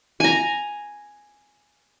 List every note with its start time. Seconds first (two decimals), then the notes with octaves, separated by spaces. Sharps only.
0.20 G#5 A#5